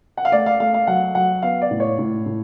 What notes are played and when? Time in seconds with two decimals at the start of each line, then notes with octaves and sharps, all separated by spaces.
0.17 F#5
0.25 F5
0.32 A3 D5
0.46 F5
0.60 A3 F5
0.74 F5
0.87 F#3 F#5
1.15 F#3 F#5
1.42 B3 F5
1.62 D5
1.71 A2
1.80 C#5
1.98 A2
2.26 A2